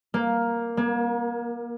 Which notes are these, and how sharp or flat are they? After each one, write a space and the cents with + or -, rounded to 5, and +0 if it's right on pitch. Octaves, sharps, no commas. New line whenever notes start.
A#3 +5
A#3 +35